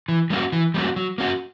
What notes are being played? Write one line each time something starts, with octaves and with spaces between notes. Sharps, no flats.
E3
G3 A#3 C#4 F#4
E3
G3 A#3 C#4 F#4
F#3
A#3 C#4 F#4